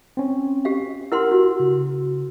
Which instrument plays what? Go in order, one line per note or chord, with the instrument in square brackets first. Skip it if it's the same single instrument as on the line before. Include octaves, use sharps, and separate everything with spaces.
[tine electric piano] C4 C#4
[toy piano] G4 F5
[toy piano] E4 F#5 C6 [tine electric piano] G4 A#4 E6
[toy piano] F#4
[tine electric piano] C#3